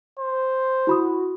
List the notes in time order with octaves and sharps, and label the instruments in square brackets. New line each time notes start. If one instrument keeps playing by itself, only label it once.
[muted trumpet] C5
[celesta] E4 B5 D#6 [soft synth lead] F#4